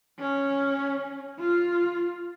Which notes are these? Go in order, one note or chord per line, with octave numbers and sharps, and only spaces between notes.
C#4
F4